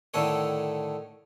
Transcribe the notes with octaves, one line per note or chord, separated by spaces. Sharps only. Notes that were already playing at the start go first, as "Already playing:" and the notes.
A2 D3 D#3 A4 C#5